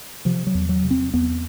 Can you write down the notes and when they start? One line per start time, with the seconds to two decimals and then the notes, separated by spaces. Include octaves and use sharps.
0.25 C3 F3
0.47 F#3
0.54 E2
0.69 F#3
0.83 C3
0.91 C4
1.13 E2 B3